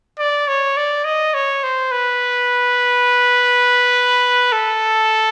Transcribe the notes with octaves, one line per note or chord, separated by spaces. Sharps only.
D5
C#5
D5
D#5
C#5
C5
B4
A4